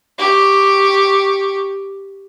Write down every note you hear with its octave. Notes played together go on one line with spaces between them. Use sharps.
G4 C#6